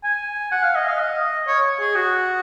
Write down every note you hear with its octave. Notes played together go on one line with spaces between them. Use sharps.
G#5
F#5
F5
D#5
F5
D#5
C#5
G#4
F#4